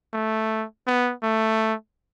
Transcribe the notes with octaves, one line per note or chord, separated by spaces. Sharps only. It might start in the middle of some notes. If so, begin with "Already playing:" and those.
A3
B3
A3